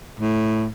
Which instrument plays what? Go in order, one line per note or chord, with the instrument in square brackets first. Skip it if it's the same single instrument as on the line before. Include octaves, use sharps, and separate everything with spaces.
[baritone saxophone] A2